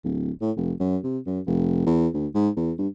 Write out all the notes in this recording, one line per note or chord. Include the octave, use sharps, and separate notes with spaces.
D1
A2
F1
F#2
C3
F#2
F1
E2
D2
G#2
E2
G2